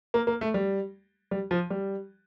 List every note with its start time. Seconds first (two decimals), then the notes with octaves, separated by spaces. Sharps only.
0.14 A#3
0.27 A#3
0.41 A3
0.54 G3
1.31 G3
1.51 F3
1.70 G3